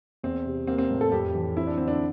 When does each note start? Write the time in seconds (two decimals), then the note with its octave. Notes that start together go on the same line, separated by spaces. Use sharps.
0.23 E2 C4
0.45 C3
0.67 A#3 C4
0.78 C4
0.91 A2
1.01 A4
1.12 F2 G4
1.35 E3
1.57 C4 E4
1.67 D4
1.77 D3 C4
1.88 D4